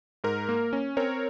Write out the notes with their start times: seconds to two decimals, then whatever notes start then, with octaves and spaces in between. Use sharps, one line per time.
0.24 G#2 A#4
0.49 A#3
0.73 C#4
0.97 C4 A#4 C#5